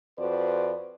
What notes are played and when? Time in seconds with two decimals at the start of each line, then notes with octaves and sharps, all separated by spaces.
0.19 F2 F#4 B4 C5 D5